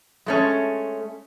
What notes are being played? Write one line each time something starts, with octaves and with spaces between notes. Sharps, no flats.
G#3 A3 C#4